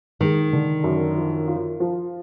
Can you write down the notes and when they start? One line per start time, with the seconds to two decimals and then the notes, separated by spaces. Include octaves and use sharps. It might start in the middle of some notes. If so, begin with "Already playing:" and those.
0.20 D#3 G#3
0.53 D3
0.84 F#2
1.16 F3
1.48 F4
1.80 F3